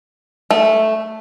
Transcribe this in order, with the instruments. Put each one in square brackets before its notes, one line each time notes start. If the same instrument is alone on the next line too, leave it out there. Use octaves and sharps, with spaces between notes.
[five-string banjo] A3